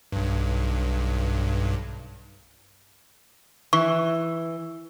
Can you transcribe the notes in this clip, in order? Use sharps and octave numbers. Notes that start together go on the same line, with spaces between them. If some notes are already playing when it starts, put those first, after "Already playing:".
B1 G2
E3 C#6